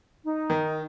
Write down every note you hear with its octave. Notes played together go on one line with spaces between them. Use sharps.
D#4
D#3